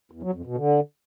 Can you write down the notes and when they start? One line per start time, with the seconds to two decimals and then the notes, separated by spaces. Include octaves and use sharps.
0.11 E2
0.23 F#3
0.34 F2
0.45 B2
0.57 D3